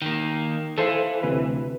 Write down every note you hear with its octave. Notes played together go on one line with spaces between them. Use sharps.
D#3 A#3
E3 A4 C5 F5
D2 C3 B4